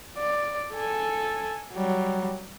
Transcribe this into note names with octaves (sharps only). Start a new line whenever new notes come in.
D5
A4 G#5
F#3 G3